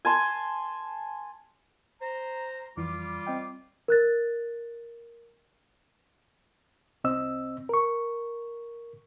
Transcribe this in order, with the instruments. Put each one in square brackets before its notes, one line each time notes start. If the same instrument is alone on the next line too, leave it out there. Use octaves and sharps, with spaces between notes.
[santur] G#5 A5 C6
[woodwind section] C5 A#5
[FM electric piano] F2 E3 [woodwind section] G3 F4 D6
[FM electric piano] C4 D#5 G5
[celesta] A#4 F#6 A6
[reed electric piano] C2 C4 D#5 E6
A#4 C#6